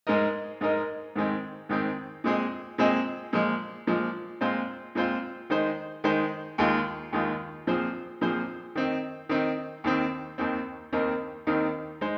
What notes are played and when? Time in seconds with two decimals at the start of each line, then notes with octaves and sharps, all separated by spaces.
0.07 G#2 G#3 D#4 A#4 D#5
0.61 G#2 G#3 D#4 A#4 D#5
1.16 G#2 D#3 G#3 C4
1.69 G#2 D#3 G#3 C4
2.24 A#2 G#3 C4 G#4 D#5
2.78 A#2 G#3 C4 G#4 D#5
3.33 A#2 F3 G#3
3.87 A#2 F3 G#3
4.41 A#2 G#3 C4 F4 C5
4.95 A#2 G#3 C4 F4 C5
5.50 D#3 G#3 D#4 C5 D#5
6.04 D#3 G#3 D#4 C5 D#5
6.58 D#2 D#3 G#3 F4
7.13 D#2 D#3 G#3 F4
7.67 A#2 F3 C4 G#4 C5
8.21 A#2 F3 C4 G#4 C5
8.75 D#3 C4 D#4
9.29 D#3 C4 D#4
9.84 D#2 D#3 C4
10.38 D#2 D#3 C4
10.93 D#2 D#3 C4 D#4 A#4
11.47 D#2 D#3 C4 D#4 A#4
12.01 G#3 D#4 C5